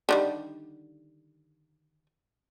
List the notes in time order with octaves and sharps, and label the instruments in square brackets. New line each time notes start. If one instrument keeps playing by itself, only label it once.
[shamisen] D3 D#3 G3